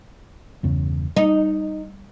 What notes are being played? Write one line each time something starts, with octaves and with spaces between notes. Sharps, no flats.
G1 E2 C#3
G3 D#4